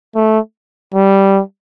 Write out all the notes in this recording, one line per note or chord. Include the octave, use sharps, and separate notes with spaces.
A3
G3